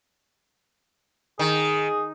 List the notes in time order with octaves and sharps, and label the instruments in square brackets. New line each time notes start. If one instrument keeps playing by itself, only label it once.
[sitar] D#3 [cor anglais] G#4